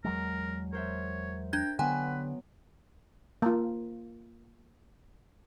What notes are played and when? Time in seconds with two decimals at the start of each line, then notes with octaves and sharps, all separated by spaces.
0.04 E2 F#3 G#3 A#4
0.73 A#4 C5 C#5 E5
1.53 D4 G5 G#6
1.79 D3 F#3 B3 B4 G5 G#5 C6
3.42 A#3 F4